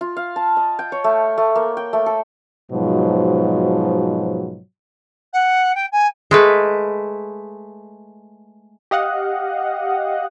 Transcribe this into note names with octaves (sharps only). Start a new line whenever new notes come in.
F4
F5
A5
D#5
G5
C#5
A3
A3
A#3
G5
A3
A4
G#2 B2 F3 F#3
F#5
G5
G#5
G#3 A3 B4
G4 D#5 F5 F#5